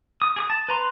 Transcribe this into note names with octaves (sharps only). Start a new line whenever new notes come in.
D#6
G#4 D#6
A5
B4 A#5 C6